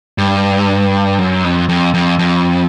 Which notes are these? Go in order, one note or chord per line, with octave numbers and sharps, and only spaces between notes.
G2
F#2
F2
F2
F2
F2